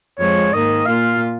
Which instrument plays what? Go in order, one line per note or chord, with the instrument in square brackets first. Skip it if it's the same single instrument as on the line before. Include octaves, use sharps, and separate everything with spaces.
[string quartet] F2 F3 G#3 [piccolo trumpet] C#5
[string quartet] G#2 D#3 A#3 [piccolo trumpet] D#5
[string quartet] A#2 A#3 F4 [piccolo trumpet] F5